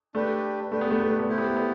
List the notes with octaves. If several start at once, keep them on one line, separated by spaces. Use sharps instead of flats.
A3 D4 G4 B4
A3 D4 G4 B4
B3
A3
B3
A3
B3
A3 E4 G4 C5
B3
A3
B3